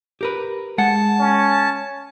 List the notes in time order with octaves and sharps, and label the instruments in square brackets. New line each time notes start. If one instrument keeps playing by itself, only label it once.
[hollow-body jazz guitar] G4 A#4 B4
[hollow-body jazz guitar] G#3 F#5 [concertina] A5
[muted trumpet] C#4